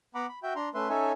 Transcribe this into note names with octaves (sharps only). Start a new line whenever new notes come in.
B3 F#5 A#5 B5 D6
B5
F#4 E5 G5 G6
D4 A#5 C6
A3 C#4 B4 E5 C6
C#4 D#4 A4 C#5 E5 G#5